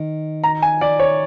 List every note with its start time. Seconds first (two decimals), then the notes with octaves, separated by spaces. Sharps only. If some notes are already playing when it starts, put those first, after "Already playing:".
Already playing: D#3
0.44 A#5
0.62 G#5
0.81 D5
1.00 C#5